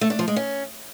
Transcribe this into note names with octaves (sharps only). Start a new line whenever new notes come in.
A3
D4
F3
G#3
C#4